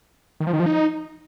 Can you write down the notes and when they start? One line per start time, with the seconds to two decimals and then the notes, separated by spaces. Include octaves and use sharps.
0.40 D#3
0.47 F3
0.53 D#3
0.60 F3
0.66 D#4